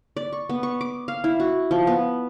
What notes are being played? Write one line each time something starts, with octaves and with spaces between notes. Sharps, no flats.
D5
C#6
B3
C#6
D6
F5
E4
F#4
F3
B3